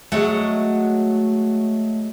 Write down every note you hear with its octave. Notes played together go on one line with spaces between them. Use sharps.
F#3 G#3 A3 F#5